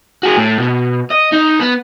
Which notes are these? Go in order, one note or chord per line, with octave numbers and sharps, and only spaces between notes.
F#4 G#4
A2
B2
D#5
D#4
B3